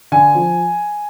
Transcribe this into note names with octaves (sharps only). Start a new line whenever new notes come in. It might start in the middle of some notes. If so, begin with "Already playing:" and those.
D3 G#5
F3